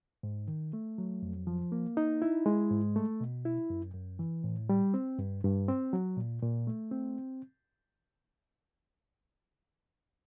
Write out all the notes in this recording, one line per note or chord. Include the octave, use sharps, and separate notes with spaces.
G#2
D#3
A3
F#3
F2
F3
A#3
D#4
E4
G#3
G#2
A3
B2
E4
F#2
F#2
E3
A2
G3
C4
G2
G2
C4
F#3
A#2
A#2
A3
C4